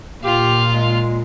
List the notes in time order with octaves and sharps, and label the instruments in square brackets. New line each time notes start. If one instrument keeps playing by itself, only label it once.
[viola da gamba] A#2 [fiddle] F4 F5 [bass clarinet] G4
[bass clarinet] G#3